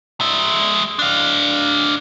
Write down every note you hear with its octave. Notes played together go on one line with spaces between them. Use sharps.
G#3 E5
D4 F5